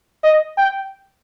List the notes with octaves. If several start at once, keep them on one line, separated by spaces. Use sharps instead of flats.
D#5
G5